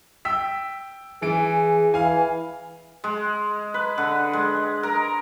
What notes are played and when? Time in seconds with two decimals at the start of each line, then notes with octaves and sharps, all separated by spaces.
0.25 G5 E6 B6
1.22 E3 G#4 D7
1.94 E3 F5 G#5
3.04 G#3
3.74 B4
3.98 D3
4.33 G#3
4.83 A#4